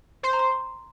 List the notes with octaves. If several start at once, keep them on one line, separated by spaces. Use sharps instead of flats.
C5 C6
A#5
C6